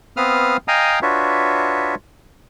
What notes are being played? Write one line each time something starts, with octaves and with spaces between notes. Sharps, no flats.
B3 C4 B4 F5 D#6 F6
D#5 F5 G5 G#5 A#5 D#6
D4 F4 F#4 B4 C#5 E5